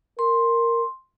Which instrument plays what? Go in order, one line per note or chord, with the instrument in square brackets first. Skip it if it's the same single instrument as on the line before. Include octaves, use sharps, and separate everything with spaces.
[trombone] A#4 [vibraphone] C6